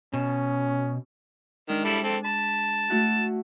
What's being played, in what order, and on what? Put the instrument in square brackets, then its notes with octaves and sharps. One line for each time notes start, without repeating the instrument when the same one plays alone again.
[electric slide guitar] B2 [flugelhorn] C#4
[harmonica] D#3 [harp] G#3 D4
[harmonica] G3 E4 A4
C4 A4
[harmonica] A5 [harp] B5
[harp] A3 E4 F#4